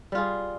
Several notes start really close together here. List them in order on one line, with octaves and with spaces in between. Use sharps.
G3 F4 G#4